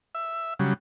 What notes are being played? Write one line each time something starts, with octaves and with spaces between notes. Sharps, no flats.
E5
C#3 F#3 G3